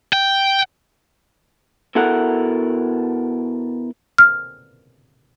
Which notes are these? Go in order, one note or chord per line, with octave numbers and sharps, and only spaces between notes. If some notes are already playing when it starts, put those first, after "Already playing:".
G5
B2 E4 A4 A#4 F#5
F6